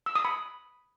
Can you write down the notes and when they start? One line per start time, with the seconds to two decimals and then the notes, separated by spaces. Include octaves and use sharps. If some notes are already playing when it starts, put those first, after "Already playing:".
0.06 E6
0.15 D#6
0.25 B5